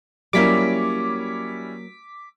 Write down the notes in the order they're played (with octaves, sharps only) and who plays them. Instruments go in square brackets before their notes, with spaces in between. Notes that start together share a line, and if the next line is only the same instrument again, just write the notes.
[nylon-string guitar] F#3 A#3 A#4 [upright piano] G3 C#4 E4 [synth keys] D6 B6